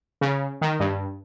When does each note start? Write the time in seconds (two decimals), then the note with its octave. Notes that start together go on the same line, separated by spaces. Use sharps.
0.21 C#3
0.61 D#3
0.80 G2